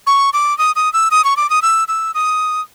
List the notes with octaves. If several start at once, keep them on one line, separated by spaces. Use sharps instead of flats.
C#6
D6
D#6
D#6
E6
D#6
C#6
D6
D#6
E6
E6
D#6